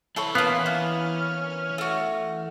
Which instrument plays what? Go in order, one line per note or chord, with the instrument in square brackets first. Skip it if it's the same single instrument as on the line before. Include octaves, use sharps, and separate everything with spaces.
[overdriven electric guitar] E3 B5 [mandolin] A4 C5 C#5
[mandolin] A#3 F4 [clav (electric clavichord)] B3 [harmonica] C#4 F6
[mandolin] A#3
A3 F#4